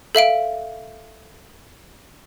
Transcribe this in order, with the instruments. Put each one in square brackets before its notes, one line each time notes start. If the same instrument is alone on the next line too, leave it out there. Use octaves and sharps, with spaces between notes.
[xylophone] A4 E5 F5 D7